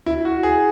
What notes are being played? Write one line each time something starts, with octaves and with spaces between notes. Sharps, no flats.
E4
F#4
G#4